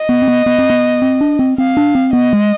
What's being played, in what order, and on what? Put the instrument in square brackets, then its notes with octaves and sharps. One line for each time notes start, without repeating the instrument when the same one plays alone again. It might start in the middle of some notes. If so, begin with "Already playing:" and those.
Already playing: [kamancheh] D#5
[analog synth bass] B3
C4
B3
B3
C4
B3
C4
D4
C4
[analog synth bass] C4 [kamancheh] F5
[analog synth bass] D4
C4
[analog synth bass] B3 [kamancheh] D#5
[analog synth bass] G#3